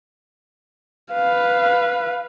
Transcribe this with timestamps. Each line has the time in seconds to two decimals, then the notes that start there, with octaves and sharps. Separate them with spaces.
1.12 B4 F5